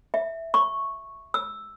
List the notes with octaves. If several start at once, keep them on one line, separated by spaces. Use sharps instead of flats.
E5
C#6
E6